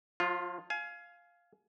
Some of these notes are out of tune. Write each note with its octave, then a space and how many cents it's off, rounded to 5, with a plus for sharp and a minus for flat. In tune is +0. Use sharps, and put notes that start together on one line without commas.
F3 +40 F4 +0
F5 +0 G#5 +25